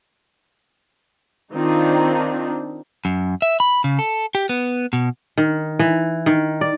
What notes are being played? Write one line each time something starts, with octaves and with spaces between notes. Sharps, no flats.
D#3 C4 D4 D#4 F4
F#2
E5
B5
C#3
A4
G4
B3
B2
D#3
E3
D#3
D5